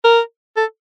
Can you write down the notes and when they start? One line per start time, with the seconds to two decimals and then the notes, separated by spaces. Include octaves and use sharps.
0.04 A#4
0.57 A4